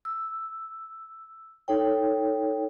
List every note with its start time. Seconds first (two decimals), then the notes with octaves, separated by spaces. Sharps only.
0.05 E6
1.68 D#4 A4 C#5 G5